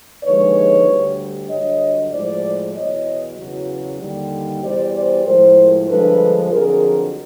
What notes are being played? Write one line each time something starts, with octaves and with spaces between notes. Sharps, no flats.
D#2 D3 F3 G#3 B4 C#5
D2 D3 G3
G2 D3 F#3 C#5 D#5
A2 F3 G#3 C5 D5
E2 B2 F#3 C#5 D#5
E2 C#3 F#3
D#2 D3 G3
E2 B2 G3 C5 D5
C5 D5
A2 F3 G#3 A#4 C5
G2 D3 F3 G#3 A4 B4
F2 D3 F#3 G#4 A#4